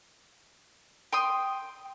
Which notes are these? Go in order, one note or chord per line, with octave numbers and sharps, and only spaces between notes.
G5 C6 D#6